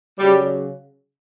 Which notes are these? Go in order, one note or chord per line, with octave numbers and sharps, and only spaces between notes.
C#3 F#3 G3